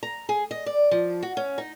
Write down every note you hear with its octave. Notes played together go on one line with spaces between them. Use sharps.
A#5
G#4
D#5
D5
F3
F#4
C#4
D#4